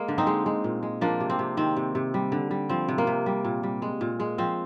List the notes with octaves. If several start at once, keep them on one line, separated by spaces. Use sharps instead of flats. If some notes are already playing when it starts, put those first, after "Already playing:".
Already playing: G#3 A#3
D3
C4 D#4
G#3
G#3
A#2
G#3
F3 A#3 D4
C3
C4
C3
D#3 C4
C3
C3
G3
D3
G3
F3 C4
C3
A#3
C3
G3
A#2
G3
G#3
A#2
G#3
F3 C4